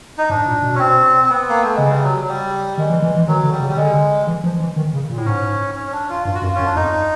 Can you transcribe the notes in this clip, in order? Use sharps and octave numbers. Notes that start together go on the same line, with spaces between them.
D#4
G#2 D4
A#2
B2
C#4
C4
C4
B3
A#3
A3
C#3 G#3
G3
F#3
F#3
G3
D#3 G#3
E3
E3
E3
D#3 F#3
D3
G3
C#3
G3
D3 G#3
E3
F3
E3
D#3
C#3
A#2
A2
G#2 C#4
C#4
C#4
D4
F4
G2 F4
F#4
F#2 F4
F#2 C#4
D4
F2 D#4